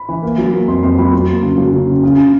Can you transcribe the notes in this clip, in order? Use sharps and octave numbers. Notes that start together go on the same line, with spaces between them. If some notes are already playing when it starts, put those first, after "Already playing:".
Already playing: B5
E3
A#3
F#3
A#3
F2 C6
F2 C6
F#3 B5
F#3 C6
A#3
C#3
F#3
C#3
C#3
C#3
C#3